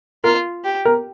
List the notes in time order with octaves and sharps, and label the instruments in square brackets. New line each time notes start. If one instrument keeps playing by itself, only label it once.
[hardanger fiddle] F4 [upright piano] A#4
[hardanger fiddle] G4
[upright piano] A#4